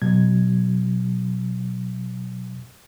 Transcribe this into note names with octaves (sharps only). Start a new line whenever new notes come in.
B2 F#3 G#6